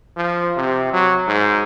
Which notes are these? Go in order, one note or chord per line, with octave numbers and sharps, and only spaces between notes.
F3
C3
F#3
G#2